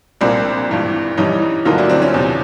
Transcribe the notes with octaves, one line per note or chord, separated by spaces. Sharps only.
C2 A#2 F3 A#3 C4 D4
G#1 G2 E3
G2 E3 G3 C#4 D#4
D2 D3 F#3 A#3 D#4 F4
D4 E4
C4 D4
C#4
E2 C3 F3